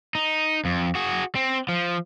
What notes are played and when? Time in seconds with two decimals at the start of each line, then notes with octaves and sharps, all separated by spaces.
0.15 D#4
0.65 F2
0.95 F#4 G#4
1.35 C4
1.69 F3